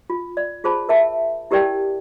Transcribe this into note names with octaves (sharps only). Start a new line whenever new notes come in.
F4
D5
F4 G#4 C5 A5 B5
A#4 E5 A5
E4 G4 A#4 D5 G5 A5